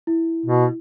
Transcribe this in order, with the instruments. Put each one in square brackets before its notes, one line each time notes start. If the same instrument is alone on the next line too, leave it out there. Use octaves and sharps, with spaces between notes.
[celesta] E4
[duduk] B2